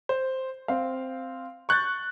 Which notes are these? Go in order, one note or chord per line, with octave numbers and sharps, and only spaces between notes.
C5
C4 F5
C#6 F#6 G6 A6